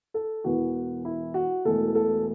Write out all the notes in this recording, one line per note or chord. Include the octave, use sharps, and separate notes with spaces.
A4
E1 E2 E3 B3 F#4
E4
F#4
E1 E2 B2 A3 A4
A4